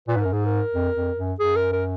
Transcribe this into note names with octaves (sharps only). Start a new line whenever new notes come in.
A#2 B4
G#2
F#2 A#4
G#2 G#4
A#4
F2
F2
F#2
F#2 G#4
A#4
A#4